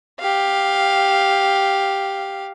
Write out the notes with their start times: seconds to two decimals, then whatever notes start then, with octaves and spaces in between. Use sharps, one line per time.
0.20 G4 F5